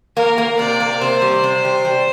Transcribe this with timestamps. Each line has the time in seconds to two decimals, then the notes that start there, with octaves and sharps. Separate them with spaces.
0.16 A#3 A#4
0.38 A#3
0.59 C3 D5
0.80 A#3
1.01 C3 C5
1.22 G3
1.44 C3
1.65 G3
1.85 G3